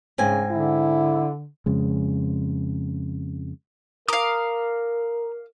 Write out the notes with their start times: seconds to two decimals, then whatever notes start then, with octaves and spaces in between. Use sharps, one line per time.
0.18 G#2 C#3 C4 G#5
0.51 D3 E4
1.66 F2 C#3 G#3
4.08 A#4 F5 A#5 D6 D#6